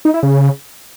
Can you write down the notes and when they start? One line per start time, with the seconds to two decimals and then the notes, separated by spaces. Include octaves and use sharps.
0.05 D#4
0.14 E4
0.23 C#3